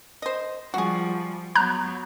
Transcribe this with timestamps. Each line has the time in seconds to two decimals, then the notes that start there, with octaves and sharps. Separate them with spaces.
0.22 C5 D#5
0.74 F3 G3 F#4 G#4
1.55 F#3 B3 A#5 F#6 G6